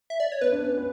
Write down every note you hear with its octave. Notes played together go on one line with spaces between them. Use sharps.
E5
D5
C#5
B3 B4
D4
C#4
B3